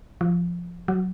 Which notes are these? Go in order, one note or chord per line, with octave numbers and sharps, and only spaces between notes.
F3
F#3